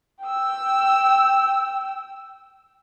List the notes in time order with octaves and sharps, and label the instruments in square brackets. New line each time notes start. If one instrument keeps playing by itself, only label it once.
[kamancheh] G5 E6